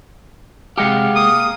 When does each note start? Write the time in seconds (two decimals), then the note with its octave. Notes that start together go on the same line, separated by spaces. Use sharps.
0.78 C3 G#3 G4 D#5 F5 F#5
1.16 A#3 D#6